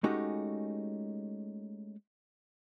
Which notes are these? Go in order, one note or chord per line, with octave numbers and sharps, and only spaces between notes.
G#3 A3 C#4 D#4 F#4 G4